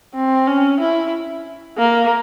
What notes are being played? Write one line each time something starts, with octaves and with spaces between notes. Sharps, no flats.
C4
C#4
E4
A#3